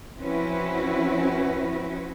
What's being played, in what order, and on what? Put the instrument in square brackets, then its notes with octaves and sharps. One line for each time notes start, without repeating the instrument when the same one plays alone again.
[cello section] F3 C4 C#4 E4 F#4 B4